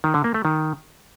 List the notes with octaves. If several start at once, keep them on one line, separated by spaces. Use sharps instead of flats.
D#3
D3
A#3
A3
D#3